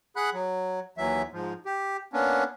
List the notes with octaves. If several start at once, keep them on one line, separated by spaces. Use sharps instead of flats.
G#4 F#5 B5 F#6
F#3
D#2 E3 F#3 E5
G#2 F3
G4
A#3 B3 C#4 D4